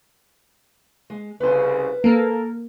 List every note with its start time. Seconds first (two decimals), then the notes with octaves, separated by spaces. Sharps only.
1.10 G#3
1.40 C2 C#3 B4 C5
2.04 A#3 A4 A#4